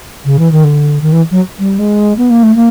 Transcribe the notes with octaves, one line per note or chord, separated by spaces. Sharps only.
C#3
E3
D#3
D3
D#3
E3
F#3
G3
G#3
B3
A#3
A3
A#3